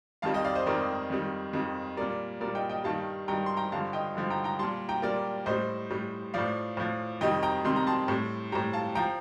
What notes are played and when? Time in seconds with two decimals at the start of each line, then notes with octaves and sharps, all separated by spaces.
0.22 F2 D#3 G3 F5 A5
0.34 D#5 G5
0.45 D5 F5
0.55 C5 D#5
0.66 F2 D#3 G3 A#4 D5
1.10 F2 D#3 G3
1.53 F2 D#3 G3
1.97 A#2 G3 A#4 D5
2.41 A#2 G3 A#4 D5
2.55 D#5 G5
2.70 D#5 G5
2.84 G2 D#3 G3 F5 A5
3.28 G2 D#3 G3 G5 A#5
3.46 C6
3.57 G5 A#5
3.72 G2 D3 F3 F5 A5
3.93 D#5 G5
4.15 G2 D3 F3
4.30 G5 A#5
4.44 G5 A#5
4.59 A#2 G3 A5 C6
4.89 G5 A#5
5.02 A#2 G3 A#4 D5
5.46 A2 G3 C5 D#5
5.90 A2 G3
6.34 A2 F3 D5 F5
6.77 A2 F3
7.21 F2 C3 D#3 G3 D#5 G5
7.43 G5 A#5
7.64 F2 C3 D#3 G3 C6
7.76 A#5
7.87 A5 C6
8.08 A2 G3
8.52 A2 G3 G5 A#5
8.73 F5 A5
8.95 F3 G5 A#5